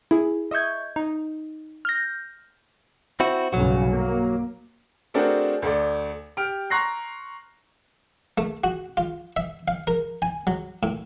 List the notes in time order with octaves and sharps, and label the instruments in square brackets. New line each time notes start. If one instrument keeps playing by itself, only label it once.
[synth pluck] E4 G#4
D#5 E5 C#6 G6 G#6
D#4
F6 G6 A#6
[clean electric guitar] C4 E4 F#4
[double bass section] B1 G2 C#3 [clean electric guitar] F#3 F#4
[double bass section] A#3
[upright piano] A3 C4 D4 F#4 G#4 A#4
D2 A3 D5
G4 F6 D7
A#5 C6 C#6 F#6 A#6 C7
[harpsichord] A3
F#4
F4
E5
F5
A#4
G#5
F#3
A2